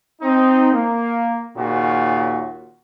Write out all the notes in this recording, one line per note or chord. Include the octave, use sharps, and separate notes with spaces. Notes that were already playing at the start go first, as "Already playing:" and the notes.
C4 D#4
A#3
D#2 A#2 C#3 F#4